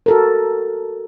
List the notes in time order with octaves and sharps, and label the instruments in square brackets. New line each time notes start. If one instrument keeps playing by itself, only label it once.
[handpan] F#4 A4 A#4